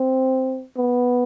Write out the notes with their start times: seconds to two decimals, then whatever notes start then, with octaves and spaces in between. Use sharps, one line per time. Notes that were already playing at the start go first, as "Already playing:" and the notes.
Already playing: C4
0.76 B3